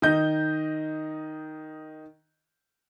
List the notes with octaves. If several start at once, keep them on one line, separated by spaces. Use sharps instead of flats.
D#3 D#5 G6